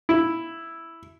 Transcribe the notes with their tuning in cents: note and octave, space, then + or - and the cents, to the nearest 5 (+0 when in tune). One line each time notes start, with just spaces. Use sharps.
E4 +0